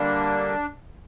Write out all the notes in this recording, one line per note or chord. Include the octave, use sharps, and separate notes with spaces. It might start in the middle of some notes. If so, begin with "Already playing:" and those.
Already playing: D3 G3 A#3 D4